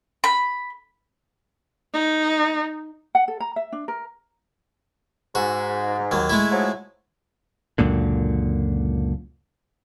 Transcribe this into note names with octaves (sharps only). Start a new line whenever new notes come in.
B5
D#4
F#5
A4
A#5
E5
D4
A#4
G#2 F#4
D#2 F#3
G#3 A3 E4
G#2 F3 F#3
C#2 F#2 A#2 D3